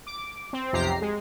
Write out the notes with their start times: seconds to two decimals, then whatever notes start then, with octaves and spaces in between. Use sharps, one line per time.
0.07 D6
0.53 C4
0.73 B1 F2 C3 G4 A#5 C7
1.02 G#3